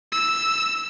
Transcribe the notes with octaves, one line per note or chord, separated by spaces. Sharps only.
E6